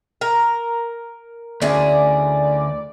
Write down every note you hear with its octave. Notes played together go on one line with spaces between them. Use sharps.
A#4
D2 C#4 E4 G#4 D5